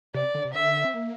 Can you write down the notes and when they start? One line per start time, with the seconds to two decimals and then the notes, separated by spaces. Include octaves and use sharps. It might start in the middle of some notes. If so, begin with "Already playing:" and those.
0.14 C3 D5
0.34 D3
0.45 C3
0.54 D3 E5
0.85 C4
0.94 A#3